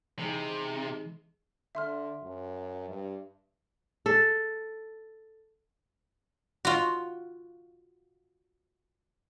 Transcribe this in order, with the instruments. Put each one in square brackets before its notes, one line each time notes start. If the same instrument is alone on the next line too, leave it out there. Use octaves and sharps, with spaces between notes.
[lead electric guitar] C3 [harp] E3 G#3 D#4
[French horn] D3 [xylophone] E5 C6 F6
[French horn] F#2
G2
[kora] A4
[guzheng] F4 F#4